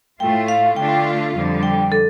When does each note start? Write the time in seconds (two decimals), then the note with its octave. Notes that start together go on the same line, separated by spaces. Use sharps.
0.20 A2 A3 F4 G5
0.48 F5
0.76 D3 A3 D4 F4 G5
1.34 F2 D3 G3
1.63 G5
1.92 A4